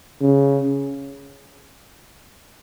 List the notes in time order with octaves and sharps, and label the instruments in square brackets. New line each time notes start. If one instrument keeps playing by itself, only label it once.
[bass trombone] C#3